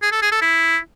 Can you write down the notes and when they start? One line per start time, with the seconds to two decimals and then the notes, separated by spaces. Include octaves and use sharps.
0.02 G#4
0.12 A4
0.22 G#4
0.32 A4
0.41 E4